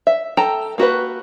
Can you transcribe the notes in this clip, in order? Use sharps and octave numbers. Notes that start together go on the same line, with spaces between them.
E5
A4 G5 A5 A#5
A#3 F#4 G4 B4